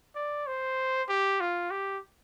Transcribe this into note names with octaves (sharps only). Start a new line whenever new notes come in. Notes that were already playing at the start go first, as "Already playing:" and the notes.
D5
C5
G4
F4
G4